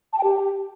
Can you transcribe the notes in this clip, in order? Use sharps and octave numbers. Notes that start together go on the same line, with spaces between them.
A5
G5
G4